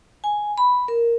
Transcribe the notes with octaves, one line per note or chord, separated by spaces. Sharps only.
G#5
B5
A#4